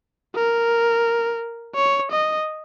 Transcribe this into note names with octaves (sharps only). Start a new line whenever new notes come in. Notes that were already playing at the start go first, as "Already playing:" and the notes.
A#4
C#5
D#5